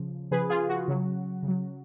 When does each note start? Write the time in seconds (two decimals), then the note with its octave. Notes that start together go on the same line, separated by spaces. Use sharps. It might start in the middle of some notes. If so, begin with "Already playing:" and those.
Already playing: C#3 F3
0.31 C#3 F3 G#4 B4
0.50 F4 G#4
0.69 F#4
0.88 C#3 F#3
1.43 C#3
1.48 F#3